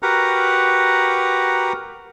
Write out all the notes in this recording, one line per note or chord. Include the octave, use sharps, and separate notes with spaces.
F#4 G4 A#4 B4 F#5 A#5